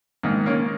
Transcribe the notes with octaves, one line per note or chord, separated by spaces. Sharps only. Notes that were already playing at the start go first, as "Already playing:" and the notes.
G#2 D#3 A#3
A#3 C#4